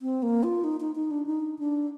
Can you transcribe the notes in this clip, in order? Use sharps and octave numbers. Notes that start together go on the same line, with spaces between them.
C4
A#3
F4
D#4
D#4
D#4
D4
D#4
D4